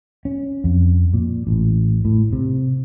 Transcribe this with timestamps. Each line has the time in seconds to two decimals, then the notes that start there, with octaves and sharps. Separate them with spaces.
0.25 C#4
0.64 F2
1.14 A#2
1.47 A1
2.05 A2
2.33 C3